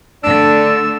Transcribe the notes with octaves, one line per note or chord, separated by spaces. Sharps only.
D3 A3 D4 E6